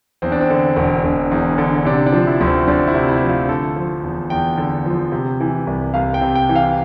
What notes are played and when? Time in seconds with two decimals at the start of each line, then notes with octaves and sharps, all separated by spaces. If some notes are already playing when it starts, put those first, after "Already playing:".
0.22 E2 C4
0.32 D4
0.41 C4
0.50 D3
0.76 E1
1.03 E1
1.31 E2
1.58 D3
1.85 C3 D4
2.06 D4
2.12 F3
2.27 E4
2.41 D2
2.47 C4
2.67 D2 D4
2.87 E4
2.94 C3
3.08 E4
3.22 F3
3.29 F4
3.49 D3 A4
3.76 F3
4.03 E2
4.30 E2 G5
4.57 D3
4.86 F3
5.12 C3
5.40 E3
5.67 C2
5.94 C2 F5
6.14 G5
6.21 C3
6.35 G5
6.49 E3
6.55 F5